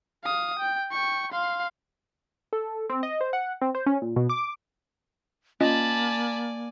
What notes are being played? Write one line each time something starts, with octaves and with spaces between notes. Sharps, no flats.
F5 D#6
G5
G5 C#6
F5 C6
A4
C4
D#5
C5
F#5
C4
C5
C#4
A#2
B2
D6
A#3 C#4 F4 D5 D#5 G#5 A5 B5